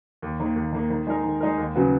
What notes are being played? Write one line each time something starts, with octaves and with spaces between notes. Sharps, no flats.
D#2
D#3 A#3
D#2
D#3 A#3
D#3
G#3 D#4 A#4
D#3
G#3 D#4 A#4
D#2
C#3 F#3 B3 F#4